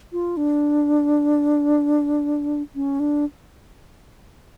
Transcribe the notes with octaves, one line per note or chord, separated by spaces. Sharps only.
F4
D4
C#4
D4